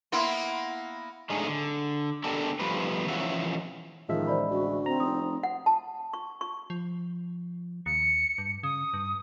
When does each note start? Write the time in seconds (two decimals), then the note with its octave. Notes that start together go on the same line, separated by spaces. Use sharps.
0.12 A#3 B3 E4 C6
1.30 A2 G#3 A3 D4 D#4 G#4
1.47 D3
2.24 B3 D4 G4 A4 A#4
2.59 F3 G3 A3 B3 B4 C5
3.06 E3 F3 C#4 E5 F#5
4.09 A1 D#3 F3 G#3 E5
4.27 C5 D5 B5
4.50 D2 F#4
4.86 C4 A#5
5.00 F1 D#6
5.43 F#5
5.66 A5
6.14 C#6
6.41 C#6
6.70 F3
7.86 D#2 C#7
8.38 G2
8.63 C#3 D#6
8.94 G2